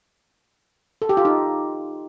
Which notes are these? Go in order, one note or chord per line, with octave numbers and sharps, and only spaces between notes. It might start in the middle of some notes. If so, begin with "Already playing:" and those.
A4
G4
F4
D#4